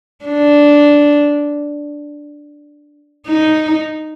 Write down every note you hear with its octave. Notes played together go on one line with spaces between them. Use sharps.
D4
D#4